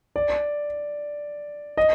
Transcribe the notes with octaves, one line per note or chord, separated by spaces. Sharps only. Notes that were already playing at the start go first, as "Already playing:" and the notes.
D5
D#5